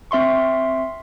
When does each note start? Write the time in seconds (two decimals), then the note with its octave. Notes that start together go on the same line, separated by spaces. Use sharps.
0.11 C4 E5 C6 C#6